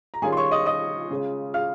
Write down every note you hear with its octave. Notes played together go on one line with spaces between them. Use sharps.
A#5
D#3 G3 C#4 F4 G#4 G#5
C6
C#5 C#6
D#5 D#6
D#5 D#6
C#3 G#3 C#4 F4
F5 F6